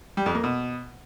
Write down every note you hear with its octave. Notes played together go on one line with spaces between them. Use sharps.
G3
F2
A#3
B2